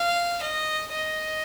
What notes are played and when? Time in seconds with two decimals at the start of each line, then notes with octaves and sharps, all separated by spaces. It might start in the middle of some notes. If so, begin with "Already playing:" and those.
Already playing: F5
0.42 D#5
0.93 D#5